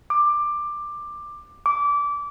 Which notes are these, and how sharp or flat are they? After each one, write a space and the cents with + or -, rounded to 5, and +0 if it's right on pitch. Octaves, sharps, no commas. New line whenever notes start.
D6 +15
D6 -20